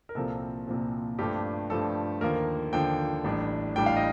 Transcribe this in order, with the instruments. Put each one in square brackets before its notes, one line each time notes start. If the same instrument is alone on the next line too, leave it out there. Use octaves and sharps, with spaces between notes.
[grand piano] A#4
C2 A#2 F3 C4 A4
C2 A#2 F3 C4
G2 F3 A3 D4 G4
G2 F3 A3 D4 A4
D#2 D3 F3 A#3 A#4
D#2 D3 F3 A#3 G5
A1 A2 G3 D4
A1 A2 G3 D4 G5
F5
D#5